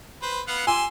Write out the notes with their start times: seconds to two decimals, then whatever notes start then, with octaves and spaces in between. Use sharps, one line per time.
0.22 B4 C5
0.48 B3 F5 F#5
0.67 G4 G#5 C6 E6